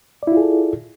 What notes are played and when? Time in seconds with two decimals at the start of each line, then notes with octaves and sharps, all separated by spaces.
0.23 D5
0.27 E4
0.32 F4
0.37 G#4
0.42 A4